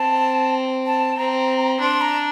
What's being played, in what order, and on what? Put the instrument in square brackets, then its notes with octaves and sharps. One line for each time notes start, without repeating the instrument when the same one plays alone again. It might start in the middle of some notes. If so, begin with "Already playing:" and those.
Already playing: [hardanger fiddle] C4 [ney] A5
[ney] A5
[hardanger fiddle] C4 [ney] A#5
[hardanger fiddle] D4 [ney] C6
[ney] A#5